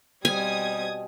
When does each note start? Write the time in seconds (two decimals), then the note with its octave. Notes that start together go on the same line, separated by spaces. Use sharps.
0.25 B2 G3 C4 G#5 D#6 G#6